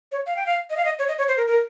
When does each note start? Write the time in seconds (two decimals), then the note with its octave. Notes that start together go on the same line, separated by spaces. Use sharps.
0.12 C#5
0.26 F5
0.36 G5
0.46 F5
0.70 D#5
0.77 F5
0.85 D#5
0.99 C#5
1.08 D#5
1.18 C#5
1.28 C5
1.37 A#4
1.47 A#4